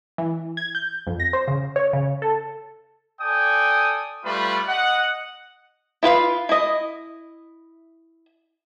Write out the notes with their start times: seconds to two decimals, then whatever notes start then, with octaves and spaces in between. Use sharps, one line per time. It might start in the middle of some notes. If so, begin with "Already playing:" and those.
0.18 E3
0.57 G#6
0.75 G6
1.07 F2
1.20 A#6
1.33 C5
1.48 C#3
1.76 C#5
1.93 C#3
2.22 A4
3.22 A4 D5 G5 G#5 D#6
4.25 G3 A3 F4 B4 B5
4.68 D#5 F#5
6.03 E4 F4 B4 F5
6.49 E4 D#5